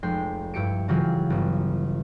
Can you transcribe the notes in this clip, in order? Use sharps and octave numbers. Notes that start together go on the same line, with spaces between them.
F1 G#3 G5 C7
G2 E4 G4 C#7 D7
C#3 E3 F#3 F4 G4 G#4
G1